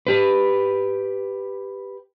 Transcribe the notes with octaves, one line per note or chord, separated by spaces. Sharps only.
G4 B4